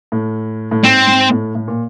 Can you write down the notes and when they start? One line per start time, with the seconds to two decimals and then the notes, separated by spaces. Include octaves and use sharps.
0.12 A2
0.71 A2
0.83 G#2 C4
1.07 G#2
1.31 A2
1.55 A2
1.68 A#2